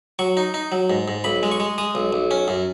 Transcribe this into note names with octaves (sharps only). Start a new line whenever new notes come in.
F#3 C#6
D#4
D#4
F#3
G#2
G#2
B1 B5
G#3
C#6
G#3
G#3 D#6
B1
B1
C#4
F#2